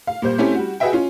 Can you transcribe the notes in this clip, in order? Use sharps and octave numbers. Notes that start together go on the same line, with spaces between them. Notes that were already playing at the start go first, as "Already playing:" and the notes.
F5
A#2 G3 C5 G6
A3 C4 C#4 E4 G4
G3 F#4
F#4 G#4 B4 D#5 E5 G5
C#4 F4